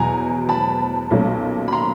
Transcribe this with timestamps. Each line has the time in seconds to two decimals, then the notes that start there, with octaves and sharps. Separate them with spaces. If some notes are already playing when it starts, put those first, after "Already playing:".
Already playing: E2 B2 F#3 G#5 A#5
0.49 A5 B5
1.11 B1 A#2 F#3 A3 C#4
1.68 B5
1.72 A#5 C6